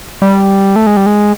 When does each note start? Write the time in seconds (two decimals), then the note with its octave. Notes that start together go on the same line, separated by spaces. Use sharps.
0.22 G3
0.76 A3
0.87 G#3
0.97 G3
1.06 G#3